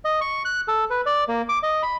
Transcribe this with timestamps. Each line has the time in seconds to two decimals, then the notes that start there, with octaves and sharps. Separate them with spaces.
0.05 D#5
0.21 C#6
0.45 F#6
0.68 A4
0.90 B4
1.06 D5
1.28 A#3
1.49 D6
1.63 D#5
1.83 B5